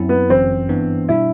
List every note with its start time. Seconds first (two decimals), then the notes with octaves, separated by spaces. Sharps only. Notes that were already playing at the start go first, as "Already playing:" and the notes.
Already playing: F#2 F#3 C4 E4
0.09 B3
0.30 G1 F#2 E3 C4
0.69 G2 E3 B3 D4
1.09 B2 G3 D4 E4